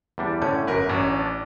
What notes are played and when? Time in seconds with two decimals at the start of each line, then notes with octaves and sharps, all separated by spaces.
0.18 E2 G3 D4
0.42 A2 D3 C#4 G6
0.67 G1 F#2 A#4 B4
0.89 A1 F#3 C#4 D4
1.20 D4